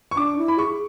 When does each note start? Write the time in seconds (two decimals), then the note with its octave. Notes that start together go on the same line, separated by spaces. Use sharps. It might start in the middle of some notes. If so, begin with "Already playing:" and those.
0.11 C#6
0.16 D4 D6
0.38 E4
0.48 B5
0.58 G#4 C#6